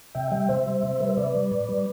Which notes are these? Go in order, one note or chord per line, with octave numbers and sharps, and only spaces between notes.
C3 E5 G5
G3 E5 G5
C3 C5 E5
G3
C3
G3 B4
C5
C3 B4 D5
G3
A2
G3